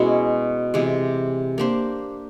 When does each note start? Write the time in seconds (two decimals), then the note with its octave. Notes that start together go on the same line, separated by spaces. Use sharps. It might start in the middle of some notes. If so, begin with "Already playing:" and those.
Already playing: B2 G#3 C#4 E4
0.74 C3 E3 G#3
1.58 A#3 D4 G4 C5